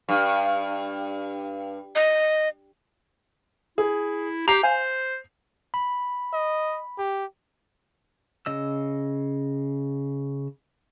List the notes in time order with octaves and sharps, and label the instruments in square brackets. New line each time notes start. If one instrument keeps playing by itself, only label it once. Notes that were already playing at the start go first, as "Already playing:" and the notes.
[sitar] G2
[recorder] D#5
[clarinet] E4 [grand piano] G#4
[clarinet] G4 [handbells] A#5 [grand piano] G6 C7 F7
[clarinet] C5 [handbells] F5 G#5
[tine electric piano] B5
[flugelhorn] D#5
G4
[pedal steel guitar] C#3 D#5 E6